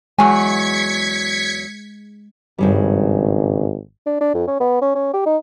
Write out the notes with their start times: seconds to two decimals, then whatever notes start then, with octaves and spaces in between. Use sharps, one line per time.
0.19 E2 F#3 G#3 G#5 G#6 B6 C#7
2.58 G#1 G2 C#3 G3
4.06 D4
4.20 D4
4.34 F2
4.47 C#4
4.60 B3
4.81 C#4
4.95 C#4
5.14 G4
5.26 D#4